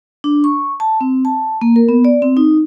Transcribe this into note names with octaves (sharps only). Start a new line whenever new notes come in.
D4
C#6
A5
C4
A5
A#3
A#4
B3
D5
C4
D#4